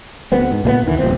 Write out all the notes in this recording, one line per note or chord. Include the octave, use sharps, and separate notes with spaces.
D2 B3 C4
G#2
C#2 A#2 G#3 B3
D2 D#3 E3
D#1 A#1 A#2 C4